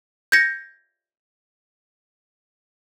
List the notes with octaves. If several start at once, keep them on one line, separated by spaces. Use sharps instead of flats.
G6 G#6 A#6 C#7